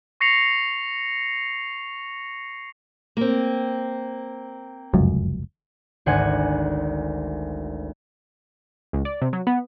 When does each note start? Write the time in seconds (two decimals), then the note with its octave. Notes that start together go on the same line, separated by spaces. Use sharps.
0.21 C#6 A#6 C7 C#7 F7
3.17 A#3 C4
4.94 F1 C#2 F#2
6.06 G#1 D2 C5 F#5 G#5 G#6
8.93 C#2
9.05 D5
9.21 C3
9.33 F#3
9.47 B3